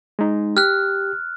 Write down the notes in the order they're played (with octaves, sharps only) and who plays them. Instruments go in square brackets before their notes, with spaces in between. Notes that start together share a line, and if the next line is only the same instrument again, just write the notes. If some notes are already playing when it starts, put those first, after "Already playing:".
[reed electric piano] G#3 D#4
[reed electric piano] G4 [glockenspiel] F6 F#6